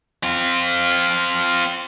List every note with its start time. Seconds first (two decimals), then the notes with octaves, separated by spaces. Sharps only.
0.23 C4 F4